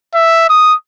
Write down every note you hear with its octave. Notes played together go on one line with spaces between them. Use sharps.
E5
D#6